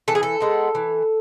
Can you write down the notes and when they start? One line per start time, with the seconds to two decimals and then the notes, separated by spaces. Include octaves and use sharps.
0.08 E3 A4
0.15 G#4
0.23 A4
0.40 G#3 B3 D#4
0.75 E3